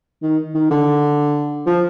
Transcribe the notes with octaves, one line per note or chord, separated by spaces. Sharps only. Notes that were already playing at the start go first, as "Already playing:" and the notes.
D#3
D#3
D3
F3